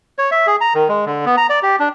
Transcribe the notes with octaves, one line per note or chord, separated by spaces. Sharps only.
C#5
E5
G#4
A#5
D#3
G#3
D3
B3
A#5
D5
G4
D4